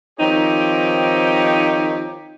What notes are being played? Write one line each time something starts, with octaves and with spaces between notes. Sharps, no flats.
D#3 F3 C4 D#4 G4 C#5